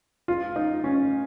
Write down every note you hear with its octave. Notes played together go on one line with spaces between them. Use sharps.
F4
D#4
C#4